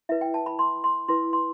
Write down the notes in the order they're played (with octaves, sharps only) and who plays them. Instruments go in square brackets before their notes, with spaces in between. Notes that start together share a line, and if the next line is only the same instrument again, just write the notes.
[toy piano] E4 B4 E5
G5
A5
B5
C6
C6
E4 B4 C6
C6